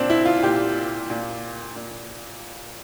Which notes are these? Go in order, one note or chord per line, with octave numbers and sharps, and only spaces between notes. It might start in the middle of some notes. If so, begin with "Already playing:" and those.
Already playing: A#2 C4 D4
E4
F4
A#2 G4
A#2
A#2